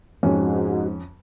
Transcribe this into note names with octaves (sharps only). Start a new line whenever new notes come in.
F2 G#2 C#4 F#4